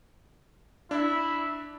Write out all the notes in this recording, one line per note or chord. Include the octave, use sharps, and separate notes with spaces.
D4 E4